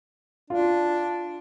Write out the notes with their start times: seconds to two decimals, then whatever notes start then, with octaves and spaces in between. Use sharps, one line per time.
0.50 D4 F4